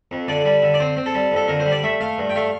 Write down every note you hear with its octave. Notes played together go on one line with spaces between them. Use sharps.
F2
D3 D5
G3
D3
D5
C4 C5
C4
A4
G3
F2 A4
D3 A#4
C5
G3
D5
A3 E5
A3 F5
G2
G5
A3 F5